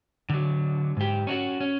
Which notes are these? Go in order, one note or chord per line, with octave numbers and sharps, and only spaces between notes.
D3 F#3
G#2 G4
C#4 D4 F#4
C#4